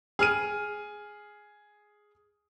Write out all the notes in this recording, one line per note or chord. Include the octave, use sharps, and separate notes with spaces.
G#4 F6 D#7